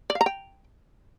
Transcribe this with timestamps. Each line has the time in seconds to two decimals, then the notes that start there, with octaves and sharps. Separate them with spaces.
0.10 D5
0.15 F5
0.21 A#5
0.26 G5